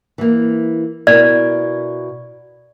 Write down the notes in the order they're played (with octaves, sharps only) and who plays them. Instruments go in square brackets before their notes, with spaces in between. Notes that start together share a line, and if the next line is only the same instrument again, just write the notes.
[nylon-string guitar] E3 A#3
[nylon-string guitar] B2 E4 A#4 [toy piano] D5